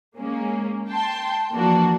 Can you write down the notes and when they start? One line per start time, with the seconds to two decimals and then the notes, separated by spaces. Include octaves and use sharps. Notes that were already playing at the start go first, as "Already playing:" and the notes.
0.16 G#3 A#3 C#4
0.89 G5 A5 C6
1.52 E3 F3 A#3 D4 F#4